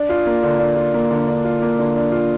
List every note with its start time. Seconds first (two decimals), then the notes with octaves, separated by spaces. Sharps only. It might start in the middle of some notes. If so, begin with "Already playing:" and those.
Already playing: D4
0.09 F4
0.27 A#3
0.43 D3
0.59 D4
0.76 F4
0.94 A#3
1.11 D3
1.27 D4
1.45 F4
1.62 A#3
1.79 D3
1.96 D4
2.12 F4